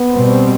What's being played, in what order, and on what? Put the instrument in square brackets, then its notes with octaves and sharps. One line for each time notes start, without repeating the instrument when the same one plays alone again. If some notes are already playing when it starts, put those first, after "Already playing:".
Already playing: [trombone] B3
[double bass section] B2 G3 C4